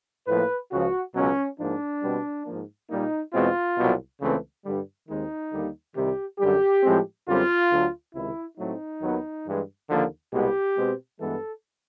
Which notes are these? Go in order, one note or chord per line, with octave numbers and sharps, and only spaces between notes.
A2 F3 A#3 B4
C#2 C#3 F3 F#4
C#2 B2 F#3 C#4
G#2 F3 A#3 D4
B2 G3 C4
G#2 F3 A#3
A#2 G3 A#3 D#4
E2 B2 G#3 C4 F4
C2 B2 F#3
C#2 C#3 E3 A3 C4
G2 D3 G3
D#2 D#3 G#3 C4 D#4
D#2 D3 G3 A#3
C2 C3 D#3 G3 G4
F#2 D3 G3 G4
A2 F3 G#3 C4
F#2 D3 G3 C4 F4
D2 D3 F#3
C#2 C3 D#3 G#3 E4
A2 F#3 A3 C4 D#4
D#2 D#3 F#3 B3
G2 E3 G#3
D#2 D3 F3 A#3
C2 B2 G#3 B3 G4
B2 G#3 C4
G2 E3 G#3 B3 A4